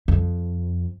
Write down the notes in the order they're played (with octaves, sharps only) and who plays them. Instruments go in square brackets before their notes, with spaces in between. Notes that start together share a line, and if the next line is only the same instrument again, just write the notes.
[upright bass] F2